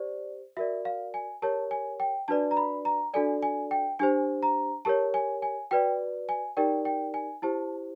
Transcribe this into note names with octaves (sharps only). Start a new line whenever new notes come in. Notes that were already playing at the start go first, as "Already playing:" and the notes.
Already playing: G4 C5 D5
F#4 A#4 D5 E5
F5
G#5
G4 A#4 C#5 A5
G#5
G5
D4 F#4 B4 D5 A5
A#5
B5
A#5
D4 F#4 A4 D5 G#5
G#5
G5
D4 G4 C5 G#5
A#5
G4 A#4 C#5 A5
G#5
G#5
F#4 B4 D5 G5
G#5
D#4 G4 A#4 D5 G5
G5
G#5
E4 G4 C5 A5